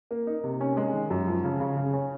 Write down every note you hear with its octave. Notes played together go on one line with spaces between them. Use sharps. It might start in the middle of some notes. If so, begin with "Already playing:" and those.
A#3
D#4
C3
C#4
G#3
D#3
F#2
F3
C#3
C#3
C#3
C#4